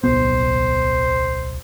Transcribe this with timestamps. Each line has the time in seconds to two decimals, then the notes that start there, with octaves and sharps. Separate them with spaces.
0.04 D1 B1 B3 C5